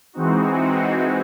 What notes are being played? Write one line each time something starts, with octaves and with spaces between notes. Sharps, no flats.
E3 G#3 C4 D#4 F#4